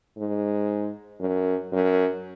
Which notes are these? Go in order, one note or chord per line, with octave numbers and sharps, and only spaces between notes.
G#2
F#2
F#2